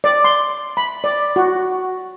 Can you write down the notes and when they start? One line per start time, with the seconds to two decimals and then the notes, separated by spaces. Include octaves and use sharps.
0.04 D5
0.24 C6
0.77 B5
1.04 D5
1.36 F#4